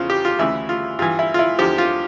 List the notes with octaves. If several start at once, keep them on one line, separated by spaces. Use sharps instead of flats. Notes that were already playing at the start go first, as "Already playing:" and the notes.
Already playing: E2 C#3 F3 F4
G4
F4
D2 C#3 E3 E4
F4
G2 E3 F4
E4
F4
E4
E2 D3 F3 G4
F4